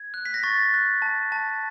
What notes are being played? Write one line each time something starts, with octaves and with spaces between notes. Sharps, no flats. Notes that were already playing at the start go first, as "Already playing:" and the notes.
Already playing: G#6
F#6
B6
A#6
C#6 A6
F#6
A5
A5